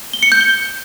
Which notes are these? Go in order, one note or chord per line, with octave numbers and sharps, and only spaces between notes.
G7
C#7
G6
G7